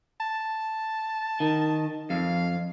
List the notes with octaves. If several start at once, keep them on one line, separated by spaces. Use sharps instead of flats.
A5
D#3
F2 F5